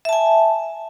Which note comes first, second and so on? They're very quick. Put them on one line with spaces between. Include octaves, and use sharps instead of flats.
E5 A5 G#5